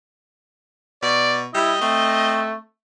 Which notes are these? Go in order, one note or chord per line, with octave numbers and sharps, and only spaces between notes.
B2 D5
G3 E4 D#5
A3 C4